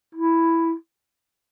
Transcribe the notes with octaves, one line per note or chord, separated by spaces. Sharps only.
E4